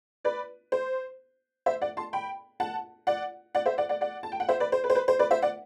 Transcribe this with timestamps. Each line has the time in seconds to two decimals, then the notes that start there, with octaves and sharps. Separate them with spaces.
0.25 B4 D5
0.72 C5
1.66 C5 E5
1.82 D5 F#5
1.97 A5 C6
2.13 G5 B5
2.60 F#5 A5
3.07 D5 F#5
3.55 D5 F#5
3.66 C5 E5
3.78 D5 F#5
3.89 D5 F#5
4.01 D5 F#5
4.23 A5
4.32 G5
4.40 F#5
4.48 C5 E5
4.60 B4 D5
4.72 C5
4.84 B4
4.90 C5
4.95 B4
5.08 C5
5.19 B4 D5
5.31 C5 E5
5.42 D5 F#5